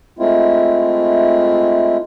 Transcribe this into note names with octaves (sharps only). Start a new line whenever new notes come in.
G#3 A3 C4 E4 F4